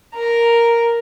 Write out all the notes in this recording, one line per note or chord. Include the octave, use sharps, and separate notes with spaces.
A#4 A#5